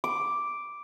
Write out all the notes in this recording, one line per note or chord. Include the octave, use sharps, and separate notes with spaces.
D6